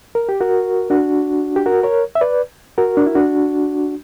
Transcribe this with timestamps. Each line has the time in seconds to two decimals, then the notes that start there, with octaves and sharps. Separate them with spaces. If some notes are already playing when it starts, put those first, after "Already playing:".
0.15 A#4
0.29 G4
0.41 F#4 A#4
0.90 D4 F#4
1.56 G4
1.66 F#4 A#4
1.83 A#4 C#5
2.15 E5
2.21 B4 D5
2.78 F#4 A#4
2.97 D4
3.06 E4
3.15 D4 F#4